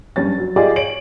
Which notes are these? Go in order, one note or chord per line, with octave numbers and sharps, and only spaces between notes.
G2 C#4 A6
F#3
F4 G4 G#4 D5 D#5
C#5 D7 F#7